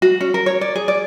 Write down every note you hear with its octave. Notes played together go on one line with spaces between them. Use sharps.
F#4
C#4
A#4
C#5
D5
G#4
D5